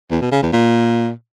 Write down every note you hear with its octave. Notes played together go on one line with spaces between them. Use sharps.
E2
B2
C#3
E2
A#2